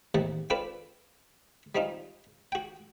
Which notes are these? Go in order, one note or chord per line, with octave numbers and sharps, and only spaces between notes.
A1 D#2 C3 F#5 A5
C4 D4 F4 A4 B4
G3 C4 D#4 F4
F#4 G5